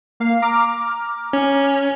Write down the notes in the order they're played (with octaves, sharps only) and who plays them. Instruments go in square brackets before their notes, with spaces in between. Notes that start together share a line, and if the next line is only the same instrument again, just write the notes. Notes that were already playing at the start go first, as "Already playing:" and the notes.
[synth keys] A#3 F5
A#5 D6 F6
[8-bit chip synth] C#4